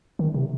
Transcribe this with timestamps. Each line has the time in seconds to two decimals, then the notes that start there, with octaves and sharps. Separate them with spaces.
0.19 D#3
0.34 C3